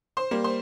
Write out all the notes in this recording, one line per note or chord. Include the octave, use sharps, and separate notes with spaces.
C5 C6
G3 A#3
C5 C6